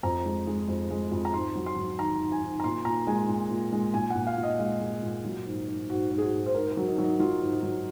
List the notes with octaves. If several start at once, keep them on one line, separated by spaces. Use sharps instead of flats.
F2 A#5
G#3
G#3
F2
G#3
F2
A#5
G#2 C6
F#3
C6
F#3
D#3 A#5
D#3
G#5
D#3
A#5
A#2 C6
A#2 A#5
G#3 G#5
A#2
A#2
G#3
A#2 G#5
F#5
A#2
F5
A#2
D#5
G#3 F5
G#3
A#2
F#3
G#2
G#2
G#2 F#4
G#2
G#4
F#4
G#2
C5
G#2 A#4
A#4
F#3
D#4
F#3
D#4
F#3 F4
G#2
D#4
F#3